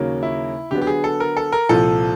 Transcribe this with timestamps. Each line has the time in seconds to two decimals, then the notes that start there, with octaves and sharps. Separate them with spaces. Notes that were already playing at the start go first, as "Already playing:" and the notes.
Already playing: D#2 C#3 F#3 A#3 C#4
0.23 E4
0.71 D3 F#3 B3 G4
0.81 G4
0.87 G#4
1.04 A4
1.20 A#4
1.37 A4
1.52 A#4
1.69 C2 A#2 F3 A4